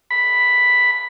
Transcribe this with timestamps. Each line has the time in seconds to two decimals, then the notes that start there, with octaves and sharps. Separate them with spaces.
0.11 B5